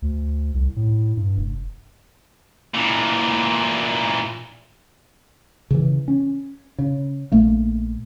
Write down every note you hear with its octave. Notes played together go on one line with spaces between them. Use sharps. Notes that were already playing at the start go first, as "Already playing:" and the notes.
D2
C2
A2
G2
F1
A#2 E3
C#3 E3
C#4
C#3
A#1 A3 A#3